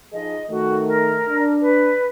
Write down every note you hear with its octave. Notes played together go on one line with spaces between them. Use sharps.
F3 D#4 G#4 D#5
D#3 A3 F#4
A#4
D4
B4